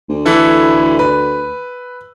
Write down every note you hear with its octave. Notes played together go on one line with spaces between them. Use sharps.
D2
E3 E4 A4
B4